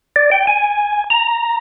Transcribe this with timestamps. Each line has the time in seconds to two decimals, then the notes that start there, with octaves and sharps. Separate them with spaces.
0.16 D5
0.32 G5
0.47 G#5
1.10 A#5